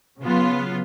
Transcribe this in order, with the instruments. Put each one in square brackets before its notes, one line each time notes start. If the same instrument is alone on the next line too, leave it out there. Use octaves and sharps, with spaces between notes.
[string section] C#3 F#3 B3 F4